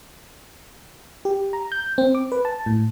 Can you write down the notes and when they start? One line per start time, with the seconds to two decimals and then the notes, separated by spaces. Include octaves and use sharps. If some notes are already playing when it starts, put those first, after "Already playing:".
1.25 G4
1.53 A#5
1.72 G6
1.98 C4
2.15 D6
2.32 B4
2.45 A5
2.66 A2